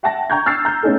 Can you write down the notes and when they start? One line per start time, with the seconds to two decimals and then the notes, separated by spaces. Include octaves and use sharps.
0.03 E5 F#5 G5 A5 A#6
0.30 G5 A#5 C#6 G6 G#6
0.46 E6 F6 A6 C7
0.65 A#5 G6
0.83 A3 B3 C#4 D#4 G#4 A4